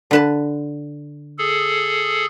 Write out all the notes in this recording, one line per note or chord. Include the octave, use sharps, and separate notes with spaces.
D3 B4 A5
G#4 A4